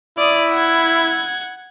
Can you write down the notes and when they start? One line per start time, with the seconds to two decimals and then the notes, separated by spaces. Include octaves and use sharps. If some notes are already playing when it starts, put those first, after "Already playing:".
0.18 E4 D5 D#6
0.52 F#5 G#6